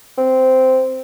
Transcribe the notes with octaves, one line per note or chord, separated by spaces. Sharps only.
C4